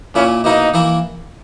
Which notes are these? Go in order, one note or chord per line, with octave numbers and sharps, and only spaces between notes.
A#2 A#3 C#4 E4
B2 A#3 D#4 E4 A#4
E3 A#3 E4 A#4